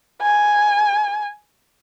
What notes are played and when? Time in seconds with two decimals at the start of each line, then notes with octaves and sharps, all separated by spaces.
0.22 G#5